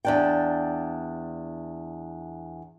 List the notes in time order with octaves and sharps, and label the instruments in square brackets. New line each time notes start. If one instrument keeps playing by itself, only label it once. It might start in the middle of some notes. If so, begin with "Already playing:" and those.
[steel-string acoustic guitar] E2 D4 G5